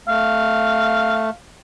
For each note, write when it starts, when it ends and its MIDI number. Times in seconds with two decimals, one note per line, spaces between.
0.08 1.30 57
0.08 1.35 77